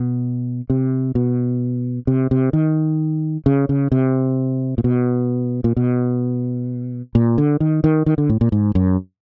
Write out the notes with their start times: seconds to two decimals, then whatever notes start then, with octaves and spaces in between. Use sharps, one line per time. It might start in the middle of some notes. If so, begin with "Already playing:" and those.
Already playing: B2
0.70 C3
1.15 B2
2.07 C3
2.31 C3
2.53 D#3
3.46 C#3
3.69 C#3
3.92 C3
4.78 A#2
4.84 B2
5.64 A#2
5.77 B2
7.15 A#2
7.38 D3
7.60 D#3
7.84 D#3
8.06 D#3
8.18 D3
8.30 A2
8.41 A#2
8.52 G#2
8.75 F#2